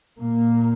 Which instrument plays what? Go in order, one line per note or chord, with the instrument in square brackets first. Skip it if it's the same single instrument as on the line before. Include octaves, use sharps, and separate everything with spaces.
[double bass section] A#2 A#3